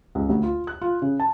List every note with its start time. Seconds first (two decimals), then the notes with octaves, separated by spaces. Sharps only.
0.15 C#2
0.29 D2
0.43 F4
0.67 F#6
0.81 F4
1.02 C#3
1.20 A5